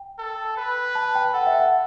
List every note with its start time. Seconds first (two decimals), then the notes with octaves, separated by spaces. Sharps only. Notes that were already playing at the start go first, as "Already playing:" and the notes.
Already playing: G5
0.18 A4
0.57 B4
0.95 A5
1.15 G5
1.34 A4 F#5
1.47 E5
1.59 F#5